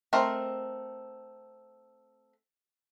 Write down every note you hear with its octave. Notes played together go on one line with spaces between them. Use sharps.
A3 C4 A#4 D#5